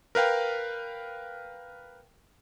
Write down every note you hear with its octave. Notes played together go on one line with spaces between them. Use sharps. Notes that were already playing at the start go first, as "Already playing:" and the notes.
A#4 B4 F5 G5